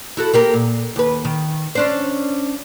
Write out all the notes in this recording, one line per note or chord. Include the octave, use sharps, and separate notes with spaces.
E4 F#4 A4
A#3 G4 A#4
A#2
D#2 B4
D#3
C#4 D4 C5